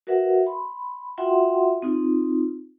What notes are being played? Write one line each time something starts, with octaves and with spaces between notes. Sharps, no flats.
F#4 A#4 B4 E5 F#5
B5 C6
F4 F#4 E5 F#5 G5 C6
C4 D#4 F4